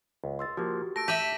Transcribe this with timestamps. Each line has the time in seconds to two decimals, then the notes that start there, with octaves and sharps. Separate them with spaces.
0.24 C#2
0.39 C6 E6 A6
0.57 F3 A#3 F#4 G4
0.96 A3 A5 E6 A#6 D7
1.08 G4 E5 B6 D#7 F#7